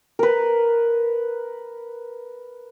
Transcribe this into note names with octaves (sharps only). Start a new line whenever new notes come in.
A#4 B4